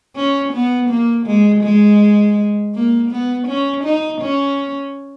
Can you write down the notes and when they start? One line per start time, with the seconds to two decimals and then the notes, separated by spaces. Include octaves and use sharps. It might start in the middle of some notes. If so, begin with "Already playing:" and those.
0.16 C#4
0.53 B3
0.90 A#3
1.26 G#3
1.64 G#3
2.75 A#3
3.11 B3
3.48 C#4
3.85 D#4
4.21 C#4